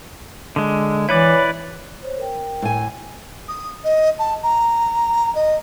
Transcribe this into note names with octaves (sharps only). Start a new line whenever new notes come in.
D3 G#3
E3 E4 B4 C#5 D5
C5 C#5
A#4 G5
A2 G#5
D#6
D#5
A5
A#5
D#5